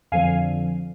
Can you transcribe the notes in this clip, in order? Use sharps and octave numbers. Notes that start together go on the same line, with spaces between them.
F2 D3 F3 F5 G#5